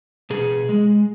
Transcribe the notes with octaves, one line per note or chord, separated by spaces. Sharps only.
B2 G#4
G#3